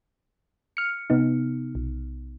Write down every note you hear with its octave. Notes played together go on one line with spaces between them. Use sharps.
F6 C#7
C3 B3 D#4
B1